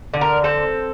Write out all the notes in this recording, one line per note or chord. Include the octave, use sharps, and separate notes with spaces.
D3
A#4
C4 A4